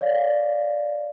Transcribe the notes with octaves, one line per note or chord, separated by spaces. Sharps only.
C#5 D5 F5